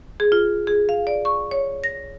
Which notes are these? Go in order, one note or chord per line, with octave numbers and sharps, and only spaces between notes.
G#4
F4
G#4
F5
D5
C#6
C#5
A#6